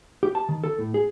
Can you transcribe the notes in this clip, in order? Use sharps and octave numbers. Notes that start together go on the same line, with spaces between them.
G4
A5
D#3
A4
A2
G#4